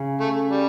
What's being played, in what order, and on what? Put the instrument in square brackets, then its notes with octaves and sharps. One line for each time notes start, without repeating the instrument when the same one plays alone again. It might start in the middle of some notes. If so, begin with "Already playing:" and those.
Already playing: [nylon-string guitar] C#3
[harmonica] A3
G3